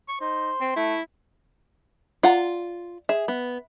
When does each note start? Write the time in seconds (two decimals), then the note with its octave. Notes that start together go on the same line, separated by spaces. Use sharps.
0.08 C#6
0.21 D#4 C5
0.61 C4
0.76 A3 E4
2.23 F4 D5 F#5 A#5
3.09 G#4 E5
3.28 B3